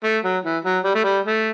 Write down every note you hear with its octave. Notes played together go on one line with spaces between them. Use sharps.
A3
F#3
E3
F#3
G3
A3
G3
A3